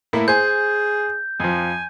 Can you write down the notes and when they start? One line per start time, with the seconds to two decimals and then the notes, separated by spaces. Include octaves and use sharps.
0.13 A2 A#3 E4
0.28 G#4 C5 G#5 G6
1.40 F2 F3 G#5